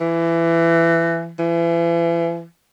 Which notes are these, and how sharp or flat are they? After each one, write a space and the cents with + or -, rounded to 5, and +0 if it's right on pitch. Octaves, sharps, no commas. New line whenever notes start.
E3 +20
E3 +40